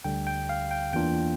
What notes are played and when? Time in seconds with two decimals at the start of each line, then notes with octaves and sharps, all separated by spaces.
0.04 D2 D3 G3 G5
0.27 G5
0.49 F5
0.71 G5
0.93 E2 E3 A#3 D4 F4 G5